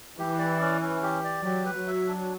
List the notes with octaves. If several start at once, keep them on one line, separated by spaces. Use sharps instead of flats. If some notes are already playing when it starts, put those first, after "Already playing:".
E3 G4
D5
C#4
C#4
G4
D5
F#3 G4
B4
F#3
E5
D4